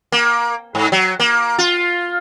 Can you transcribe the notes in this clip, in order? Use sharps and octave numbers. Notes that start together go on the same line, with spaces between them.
A#3
G#2
F#3
A#3
F4